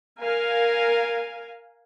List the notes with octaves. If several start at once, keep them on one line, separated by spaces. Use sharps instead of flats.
A#4 F5 G#5